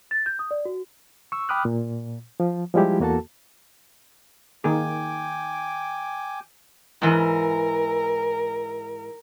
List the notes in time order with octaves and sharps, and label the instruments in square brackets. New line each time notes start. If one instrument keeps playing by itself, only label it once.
[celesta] A6
G6
D#6
D5
F#4
[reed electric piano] C#6 E6
G5 B5 D6 D#6 F6 F#6
A#2
F3
F3 G3 G#3 E4 G4
E2 A#3 F#4 A4 A5
[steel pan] D#3 A#3 G#4 [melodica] G5 G#5 D6
[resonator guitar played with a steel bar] G#2 E3 [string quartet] A#4